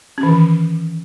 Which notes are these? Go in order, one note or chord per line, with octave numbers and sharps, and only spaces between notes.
C#4
E3
D#3